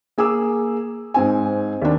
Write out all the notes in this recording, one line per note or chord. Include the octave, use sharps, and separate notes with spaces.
A#3 G#4 D6 E6
G#2 C4 G#5
D#2 D4